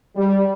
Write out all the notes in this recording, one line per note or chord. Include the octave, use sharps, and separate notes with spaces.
G3